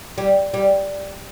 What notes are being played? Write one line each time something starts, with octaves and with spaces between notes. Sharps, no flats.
G3
G3